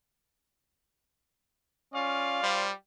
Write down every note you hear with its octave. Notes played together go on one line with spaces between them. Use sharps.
C#4 F4 D5 F5
G3 C5